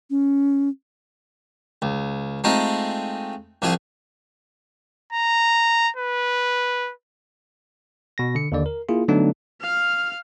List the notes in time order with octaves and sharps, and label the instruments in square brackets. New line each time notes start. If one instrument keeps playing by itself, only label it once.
[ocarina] C#4
[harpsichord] C#2
G#3 A3 C4 D#4 F4
C2 F3 E4 G#4
[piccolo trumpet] A#5
B4
[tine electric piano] B2 A#6
D3 C#7
D#2 D3 D5
A#4
A#3 E4 F4 G#4
D3 F#3 A3 B3 D4 D#4
[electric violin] F5 F6